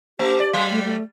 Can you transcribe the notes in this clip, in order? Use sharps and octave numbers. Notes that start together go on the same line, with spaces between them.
A3 G4
D5
F#3 G3
A3
A3